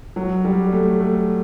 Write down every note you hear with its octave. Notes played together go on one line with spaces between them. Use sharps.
F#3
G3
A3
A3